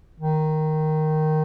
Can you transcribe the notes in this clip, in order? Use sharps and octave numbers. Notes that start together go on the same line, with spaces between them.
D#3